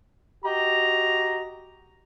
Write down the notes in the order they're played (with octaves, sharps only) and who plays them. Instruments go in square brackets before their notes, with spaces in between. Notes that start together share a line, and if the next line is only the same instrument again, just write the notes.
[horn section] F#4 G4 D#5 A#5